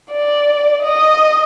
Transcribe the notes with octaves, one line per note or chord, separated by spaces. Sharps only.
D5
D#5